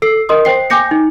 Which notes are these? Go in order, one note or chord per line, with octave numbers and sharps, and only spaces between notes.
A4 E6 C7
A#4 D#5 C6 D#6
C5 G5 C7
G5 G#5 D6 G6 A#6 C#7
D#4